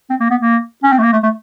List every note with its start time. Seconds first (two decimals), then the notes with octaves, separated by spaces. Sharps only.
0.10 C4
0.20 A#3
0.31 B3
0.41 A#3
0.84 C#4
0.92 C4
0.98 A3
1.03 A#3
1.13 A3
1.23 A3